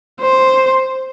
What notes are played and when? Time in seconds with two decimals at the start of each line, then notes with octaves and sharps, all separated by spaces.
0.21 C5